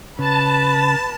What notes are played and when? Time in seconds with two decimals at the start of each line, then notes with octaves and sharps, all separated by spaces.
0.19 C#3 B4 A5